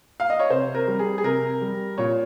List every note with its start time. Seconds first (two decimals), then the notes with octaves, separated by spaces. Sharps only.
0.20 F5
0.30 D#5
0.39 C#5
0.50 C3 C5
0.75 A#4
0.87 G3
0.99 G#4
1.18 G#4
1.24 C3 A#4
1.61 G3
1.98 A#2 C#5